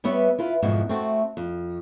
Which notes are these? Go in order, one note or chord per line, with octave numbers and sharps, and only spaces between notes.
G3 B3 B4 C#5 E5
E4 F4 B4
F2 G#2 B2 E3
A3 C4 E4 F#4
F2